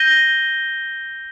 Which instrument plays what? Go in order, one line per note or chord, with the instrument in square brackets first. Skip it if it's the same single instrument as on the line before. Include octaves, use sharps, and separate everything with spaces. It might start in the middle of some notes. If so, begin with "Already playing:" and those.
Already playing: [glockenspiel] G6 A#6 D#7 G7